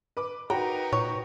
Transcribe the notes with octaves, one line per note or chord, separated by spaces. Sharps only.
B4 D6
D#4 F#4 A#4 B4 G5 A#5 B5
A#2 C#5